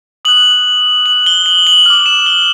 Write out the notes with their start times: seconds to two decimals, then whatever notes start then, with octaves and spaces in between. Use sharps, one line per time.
0.25 D#6 F#6 F#7
1.06 F#7
1.26 G7
1.46 F#7
1.67 F#7
1.86 D6 F6 F#7
2.06 E7
2.26 G7